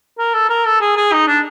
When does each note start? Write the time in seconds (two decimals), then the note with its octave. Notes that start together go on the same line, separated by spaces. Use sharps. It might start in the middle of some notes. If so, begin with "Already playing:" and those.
0.19 A#4
0.34 A4
0.50 A#4
0.66 A4
0.81 G#4
0.97 G#4
1.12 D#4
1.27 D4